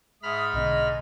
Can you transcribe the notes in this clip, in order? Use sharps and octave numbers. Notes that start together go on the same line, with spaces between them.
G#2 E5 B5 D#6 F6
B1 B2 D3 D#5